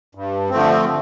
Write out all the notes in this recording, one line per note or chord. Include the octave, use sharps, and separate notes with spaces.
G2
D3 F3 A3 C4